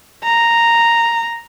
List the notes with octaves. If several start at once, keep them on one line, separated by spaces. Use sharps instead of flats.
A#5